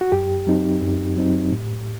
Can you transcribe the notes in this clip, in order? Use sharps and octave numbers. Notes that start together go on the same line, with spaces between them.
F#4
F#2 G4
F#3 C4 D#4
F#2
F#3 C4 D#4
A2